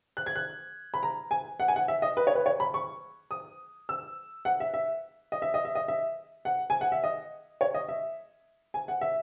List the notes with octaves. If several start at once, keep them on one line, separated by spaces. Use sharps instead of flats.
F#6
G#6
F#6
B5
A#5
G#5
F#5
G#5
F#5
E5
D#5
B4
C#5
B4
C#5
B5
C#6
D#6
E6
F#5
E5
E5
D#5
E5
D#5
E5
D#5
E5
F#5
G#5
F#5
E5
D#5
C#5
D#5
E5
G#5
F#5
E5